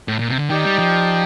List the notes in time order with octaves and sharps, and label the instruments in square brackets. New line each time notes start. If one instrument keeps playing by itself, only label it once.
[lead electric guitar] A2
A#2
C3
D3
[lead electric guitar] D#3 [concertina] D#4 G4 D5 G5
[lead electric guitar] G3
F3